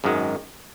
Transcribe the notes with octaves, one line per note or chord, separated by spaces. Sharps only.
G#1 F#2 D#3 G#3